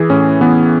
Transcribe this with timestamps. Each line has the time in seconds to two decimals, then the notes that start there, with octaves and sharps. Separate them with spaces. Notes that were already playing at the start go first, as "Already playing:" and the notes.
Already playing: E3 E4 G#4
0.10 A2 C#4
0.41 E3 B3